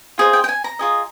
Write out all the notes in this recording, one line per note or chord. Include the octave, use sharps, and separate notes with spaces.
F4 G#4 C5 D#5
G5
G5
G#5
A#5
F4 G#4 D#5